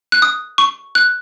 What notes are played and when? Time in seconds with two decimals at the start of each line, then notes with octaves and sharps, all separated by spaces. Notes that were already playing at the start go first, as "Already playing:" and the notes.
0.12 F#6
0.22 D#6
0.58 C#6
0.95 F#6